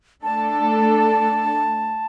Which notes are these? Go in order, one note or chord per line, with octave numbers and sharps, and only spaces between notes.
A3 D4 A4 A5